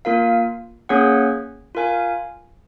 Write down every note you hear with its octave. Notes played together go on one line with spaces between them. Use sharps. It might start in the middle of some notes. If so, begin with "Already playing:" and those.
A#3 F4 A#4 F5
A#3 C#4 G#4 C#5 F#5
F4 A#4 F5 G#5